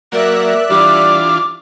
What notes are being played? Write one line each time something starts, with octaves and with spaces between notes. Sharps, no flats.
F#3 A#3 A#4 D5 E5 F#6
E3 G3 D4 F4 D6